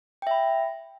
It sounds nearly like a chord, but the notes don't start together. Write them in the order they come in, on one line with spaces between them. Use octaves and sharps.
G5 E5 B5